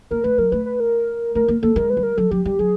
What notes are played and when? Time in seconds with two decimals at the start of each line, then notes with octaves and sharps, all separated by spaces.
0.11 A#3 A#4
0.24 A3 B4
0.38 F#3 A#4
0.52 A3 B4
0.66 B4
0.80 A#4
1.35 A3 A#4
1.48 A#3
1.62 A#3 A4
1.76 G#3 A#4
1.90 B4
1.97 G3
2.03 A#4
2.17 F#3 A4
2.31 F#3 G4
2.45 G3 G4
2.59 F#3 G#4